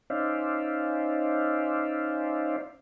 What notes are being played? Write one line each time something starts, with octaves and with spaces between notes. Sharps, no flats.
C#4 D#4 C5 D5 E5 F5